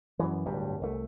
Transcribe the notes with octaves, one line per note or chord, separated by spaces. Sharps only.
F#2 E3
D1 G1 G2 G3
C2 A3